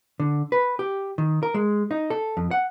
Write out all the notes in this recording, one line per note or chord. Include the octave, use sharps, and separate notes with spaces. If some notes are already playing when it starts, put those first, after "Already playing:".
D3
B4
G4
D#3
A#4
G#3
D#4
A4
F2
F#5